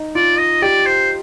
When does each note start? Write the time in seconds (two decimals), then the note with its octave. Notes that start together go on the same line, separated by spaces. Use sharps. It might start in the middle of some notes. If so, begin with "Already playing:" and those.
Already playing: D#4
0.15 F4 D5
0.39 D#5
0.62 G4 D5
0.86 C5